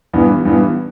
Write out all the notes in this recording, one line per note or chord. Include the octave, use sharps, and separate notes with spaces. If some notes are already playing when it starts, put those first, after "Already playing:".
G2 E3 B3
G2 E3 B3